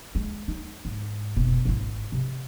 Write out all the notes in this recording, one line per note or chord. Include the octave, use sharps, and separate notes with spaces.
G#3
D#4
G#2
F1 B2
G#1 E4
C3